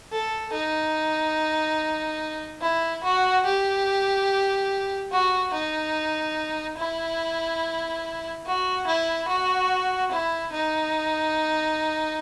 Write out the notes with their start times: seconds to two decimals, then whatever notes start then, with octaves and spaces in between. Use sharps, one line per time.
0.12 A4
0.53 D#4
2.61 E4
3.04 F#4
3.45 G4
5.12 F#4
5.54 D#4
6.78 E4
8.46 F#4
8.87 E4
9.29 F#4
10.12 E4
10.54 D#4